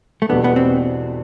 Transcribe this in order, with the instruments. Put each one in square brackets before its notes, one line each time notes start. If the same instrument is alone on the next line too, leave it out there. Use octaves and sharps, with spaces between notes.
[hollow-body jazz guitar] A3
[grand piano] E2 B2 G3 D4 A4 [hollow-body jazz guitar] B3
[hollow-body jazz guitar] B3
C4